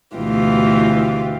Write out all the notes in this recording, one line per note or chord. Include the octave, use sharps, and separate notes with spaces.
D2 B2 E3 F4 G4